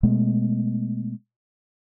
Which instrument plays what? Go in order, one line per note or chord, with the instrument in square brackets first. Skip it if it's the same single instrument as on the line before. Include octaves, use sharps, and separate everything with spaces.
[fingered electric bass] B2 G#3 A3 B3